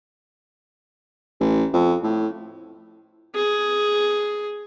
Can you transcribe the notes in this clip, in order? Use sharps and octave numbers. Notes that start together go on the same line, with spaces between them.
A1
F2
A2
G#4